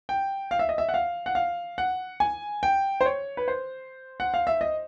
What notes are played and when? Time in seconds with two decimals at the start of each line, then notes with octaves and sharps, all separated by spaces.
0.09 G5
0.51 F5
0.59 E5
0.69 D#5
0.78 E5
0.89 F#5
0.94 F5
1.26 F#5
1.35 F5
1.78 F#5
2.20 G#5
2.63 G5
3.01 C5
3.06 C#5
3.37 B4
3.48 C5
4.20 F#5
4.34 F5
4.47 E5
4.61 D#5